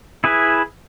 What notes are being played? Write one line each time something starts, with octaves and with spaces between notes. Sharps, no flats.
E4 G#4 B4